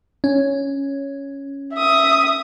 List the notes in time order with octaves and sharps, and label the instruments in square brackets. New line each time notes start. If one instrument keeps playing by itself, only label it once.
[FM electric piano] C#4
[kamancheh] E5 D#6